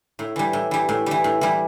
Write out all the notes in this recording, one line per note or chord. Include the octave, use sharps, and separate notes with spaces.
A2
E3 G3
A2
E3 G3
A2
E3 G3
A2
E3 G3